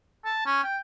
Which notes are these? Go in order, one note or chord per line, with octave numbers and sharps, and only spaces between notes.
A5
C#4
G5